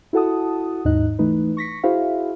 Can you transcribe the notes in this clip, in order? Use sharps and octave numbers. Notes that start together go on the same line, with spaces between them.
E4 F#4 A4 F#5 A5 D#6
D#2 G#2 D#4 D#5 F#6
E3 A3 D#4 B4
C#6 A#6 B6 C#7
E4 F#4 G#4 C5 E5 F5